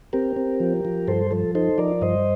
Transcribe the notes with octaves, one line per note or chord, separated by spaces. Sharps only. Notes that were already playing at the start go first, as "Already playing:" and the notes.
C4 G4 A#4
C4
F3
F3
G2 A4 C5
F3 A4
D#4 A4 C5
F3 A#4 D5
G2 C5 D#5